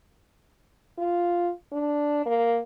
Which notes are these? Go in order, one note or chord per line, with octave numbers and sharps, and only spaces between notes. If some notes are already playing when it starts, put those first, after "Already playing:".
F4
D4
A#3